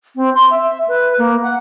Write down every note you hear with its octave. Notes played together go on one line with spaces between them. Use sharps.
C4
C6
E5
B4
A#3
F#5